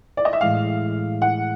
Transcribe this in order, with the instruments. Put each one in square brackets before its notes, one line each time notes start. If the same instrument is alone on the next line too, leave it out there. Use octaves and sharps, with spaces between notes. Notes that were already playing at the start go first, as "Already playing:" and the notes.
[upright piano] D5
D#5
E5
[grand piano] A2 E3 G#3 [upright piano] F5
[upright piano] F#5